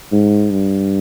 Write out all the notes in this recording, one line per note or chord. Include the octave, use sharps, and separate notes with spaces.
G#2
G2